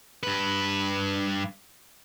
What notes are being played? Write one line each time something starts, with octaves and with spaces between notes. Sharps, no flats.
G2 B4